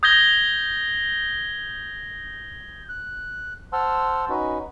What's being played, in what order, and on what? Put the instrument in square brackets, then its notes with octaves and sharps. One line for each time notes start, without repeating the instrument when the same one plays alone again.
[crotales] D#6 G6 G#6 A#6 G7
[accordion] F#6
C5 F#5 A5 C6 E6 F6
C#4 D#4 F#4 B4